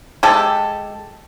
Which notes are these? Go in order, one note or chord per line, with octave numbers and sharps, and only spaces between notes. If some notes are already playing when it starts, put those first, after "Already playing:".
G#3 G4 A4